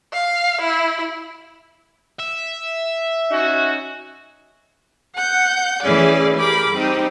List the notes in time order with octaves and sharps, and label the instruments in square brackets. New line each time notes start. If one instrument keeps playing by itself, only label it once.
[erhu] F5
E4
[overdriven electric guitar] E5
[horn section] C#4 D#4 F#4
[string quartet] F#5 G6
E3 A3 C#4 G#4 D5
G4 G#4 A#4 B5 D6
G3 C4 D#4 G4